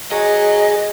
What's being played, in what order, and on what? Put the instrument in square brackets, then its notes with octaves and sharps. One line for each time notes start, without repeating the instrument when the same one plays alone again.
[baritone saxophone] F#3 [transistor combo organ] G#4 [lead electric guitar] D#5